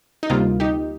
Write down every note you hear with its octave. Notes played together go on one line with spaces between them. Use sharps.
D#4
D2 C3 G3 A#3 F4
D#4 G4